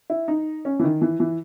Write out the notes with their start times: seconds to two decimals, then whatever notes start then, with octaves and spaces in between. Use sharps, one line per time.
0.10 E4
0.28 D#4
0.65 C#4
0.79 E3
0.84 D#3
1.02 E3
1.20 E3